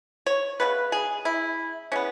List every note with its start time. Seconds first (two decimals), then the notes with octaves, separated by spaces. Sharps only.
0.26 C#5
0.60 C#3 G#3 B3 B4
0.92 G#4
1.25 E4
1.92 E3 G#3 B3 C#4